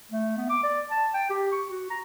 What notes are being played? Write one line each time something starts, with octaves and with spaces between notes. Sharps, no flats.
A3
B3
D6
D5
A5
G5
G4
C#6
F#4
A#5